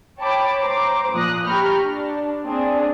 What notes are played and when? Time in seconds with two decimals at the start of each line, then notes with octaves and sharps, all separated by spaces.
0.20 C#5 G5 A5 B5 D6
0.62 C5 A#5 D6
1.13 A#2 F3 D#6 F#6 A#6
1.45 G4 A#5 B5 C#6 F6 G6
1.85 D4
2.44 A#3 C4 D4 G#4